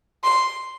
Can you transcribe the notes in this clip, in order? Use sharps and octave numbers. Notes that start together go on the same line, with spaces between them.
C6